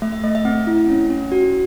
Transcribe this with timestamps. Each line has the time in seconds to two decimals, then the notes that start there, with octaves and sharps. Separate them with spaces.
0.02 A3 E5
0.12 E5
0.24 A3 D#5
0.35 E5
0.45 C4 F#5
0.67 E4
0.89 C#4
1.10 C#4
1.32 F#4